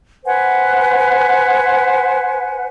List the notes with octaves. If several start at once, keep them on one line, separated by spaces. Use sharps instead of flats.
B4 C5 F#5 G#5